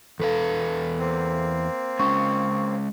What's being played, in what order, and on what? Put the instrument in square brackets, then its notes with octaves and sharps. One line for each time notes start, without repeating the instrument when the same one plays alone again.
[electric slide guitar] E2 B4 F5 [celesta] A4
[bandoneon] A#3 C4
[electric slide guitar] G#3 C#4 [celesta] C#6